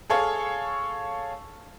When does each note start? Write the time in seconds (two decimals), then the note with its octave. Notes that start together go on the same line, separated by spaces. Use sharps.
0.10 G#4 A4 C#5 F5